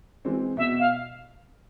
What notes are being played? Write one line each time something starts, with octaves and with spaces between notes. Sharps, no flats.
E3 G#3 C4
B2 E5
F5